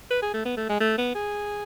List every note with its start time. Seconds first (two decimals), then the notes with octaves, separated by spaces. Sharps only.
0.11 B4
0.22 G#4
0.33 A3
0.45 B3
0.57 A3
0.69 G#3
0.80 A3
0.98 B3
1.15 G#4